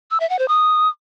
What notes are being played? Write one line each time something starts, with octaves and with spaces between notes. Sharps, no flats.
E6
E5
F#5
C5
D#6